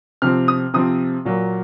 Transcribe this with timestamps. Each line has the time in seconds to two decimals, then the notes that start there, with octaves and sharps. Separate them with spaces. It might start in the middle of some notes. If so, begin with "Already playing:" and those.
0.22 C3 F3 C4 F6
0.48 D#6
0.74 C3 F3 C4 D#6
1.25 A#2 F#3 A#3